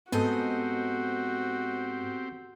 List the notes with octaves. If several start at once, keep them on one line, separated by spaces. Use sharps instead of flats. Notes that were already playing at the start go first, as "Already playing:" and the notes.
G#2 B3 C4 F#4 G4 A4 D#5 G#5